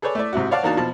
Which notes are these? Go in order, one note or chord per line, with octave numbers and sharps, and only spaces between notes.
G#4 A4 B4 C#5 D5
A3 E4 D5
G#2 C3 E4 F#4
C#5 D5 F5 F#5 A5 D6
E2 A#3 D4 D#4 F#4 A5
B2 F3 A5